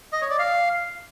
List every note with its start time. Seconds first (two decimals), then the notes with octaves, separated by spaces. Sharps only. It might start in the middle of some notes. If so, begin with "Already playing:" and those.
0.13 D#5
0.21 C#5
0.30 D5
0.39 F5